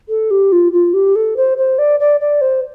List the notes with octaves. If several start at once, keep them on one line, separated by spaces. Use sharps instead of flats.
A4
G4
F4
F4
G4
A4
C5
C5
D5
D5
D5
C5